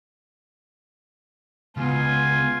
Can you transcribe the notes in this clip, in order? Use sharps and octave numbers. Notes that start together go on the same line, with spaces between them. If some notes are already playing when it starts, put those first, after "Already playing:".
C#2 B3 F4 G#5